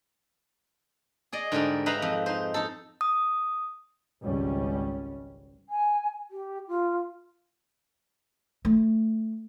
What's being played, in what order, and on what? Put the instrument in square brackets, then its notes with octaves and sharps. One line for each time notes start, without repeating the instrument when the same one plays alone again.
[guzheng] G#4 D5 D#5
G#2 D3 G3 A#4
D#4 B4 E5 F5 A#5 B5
F2
D#4 C5
D#4 A4
[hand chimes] D#6
[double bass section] G#1 C#2 G3 C#4
[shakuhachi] G#5
G4
F4
[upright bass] A3